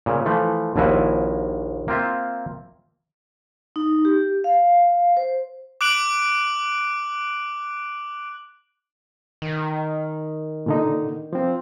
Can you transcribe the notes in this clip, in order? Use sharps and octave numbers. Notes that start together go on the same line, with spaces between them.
A#2 C#3
E3 F3 A3
A#1 D#2 F3 E4 F#4 G#5
A#3 C4 F4 E5
D#4
G4
F5
C5
D6 F#6 D7 F#7
D#3
A#2 D3 D#4
F3 C4